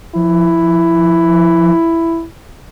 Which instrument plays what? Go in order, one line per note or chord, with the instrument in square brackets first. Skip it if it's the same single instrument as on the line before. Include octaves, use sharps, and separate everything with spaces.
[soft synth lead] F3 [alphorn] E4